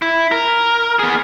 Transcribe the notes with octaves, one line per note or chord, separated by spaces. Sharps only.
E4
A#4
B3 G#4